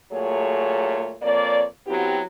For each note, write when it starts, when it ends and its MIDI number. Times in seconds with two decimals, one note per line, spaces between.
0.12 1.15 46
0.12 1.15 54
0.12 1.15 57
0.12 1.15 68
0.12 1.15 73
1.23 1.65 41
1.23 1.65 58
1.23 1.65 73
1.23 1.65 74
1.87 2.20 54
1.87 2.20 59
1.87 2.20 60
1.87 2.20 64
1.87 2.20 66
1.87 2.20 67